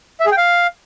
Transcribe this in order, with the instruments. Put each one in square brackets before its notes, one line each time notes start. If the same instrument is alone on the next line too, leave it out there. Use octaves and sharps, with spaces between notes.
[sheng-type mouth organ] E5
G#4
G5
F5